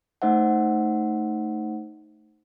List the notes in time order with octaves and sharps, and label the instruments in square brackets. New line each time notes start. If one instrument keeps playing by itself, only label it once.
[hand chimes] A3 D#4 C5 E5 F#5